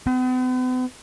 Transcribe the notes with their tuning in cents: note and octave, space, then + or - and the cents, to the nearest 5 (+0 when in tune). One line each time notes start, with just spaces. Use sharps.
B3 +45